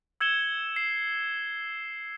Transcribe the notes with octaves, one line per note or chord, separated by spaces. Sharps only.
E6 G#6 C#7 E7 G7
C7